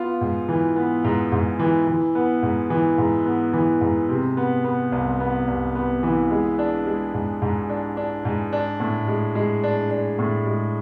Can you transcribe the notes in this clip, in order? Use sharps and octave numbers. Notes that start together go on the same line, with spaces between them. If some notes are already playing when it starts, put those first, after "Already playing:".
Already playing: B3 F4
G#2
E3
B3
G#2
G#2
E3
E3
B3
G#2
E3
G#2
B3
E3
G#2
C3
B3
B3
C2
B3
C2
B3
E3
G#3
D4
G#3
G#2
G#2
D4
D4
G#2
D4
A2
G#3
G#3
D4
D4
A2
G#3